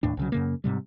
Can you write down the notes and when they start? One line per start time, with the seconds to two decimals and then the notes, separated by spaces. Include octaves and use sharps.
0.03 D#2 A2 D4
0.17 C2 C#3 F#3
0.32 F#2 C#3 A#3
0.64 G#2 C3 G3